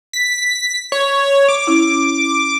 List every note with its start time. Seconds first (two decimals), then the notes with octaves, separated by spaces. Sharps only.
0.13 B6
0.92 C#5
1.48 D6
1.67 C#4 E4